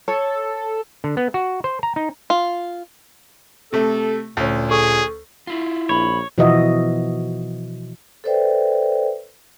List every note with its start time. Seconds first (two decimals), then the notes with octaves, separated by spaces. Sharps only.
0.08 A4 C#5
1.04 D3
1.17 B3
1.34 F#4
1.64 C5
1.83 A#5
1.96 D#4
2.30 F4
3.73 C3 A3 A4
4.37 D2 A#2 C#4
4.71 G#4 A4 C#6
5.47 E4 F4
5.89 A#1 C#5 B5
6.38 B2 E3 F3 F#4 D#5 E5
8.24 A4 B4 C5 D5 E5 G5